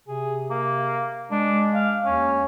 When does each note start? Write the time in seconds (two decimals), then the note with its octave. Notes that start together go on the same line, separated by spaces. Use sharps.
0.08 C3 G#4
0.50 A#3
1.31 G#3 D4
1.74 F5
2.05 D#2 C#4